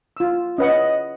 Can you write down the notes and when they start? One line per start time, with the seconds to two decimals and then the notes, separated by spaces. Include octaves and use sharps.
0.17 F4 E6
0.58 C#4 B4 D#5 F#5